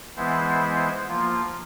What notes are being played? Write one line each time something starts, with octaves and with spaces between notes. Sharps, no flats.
E3 G#3 B3 E4 C5
F3 A#3 F4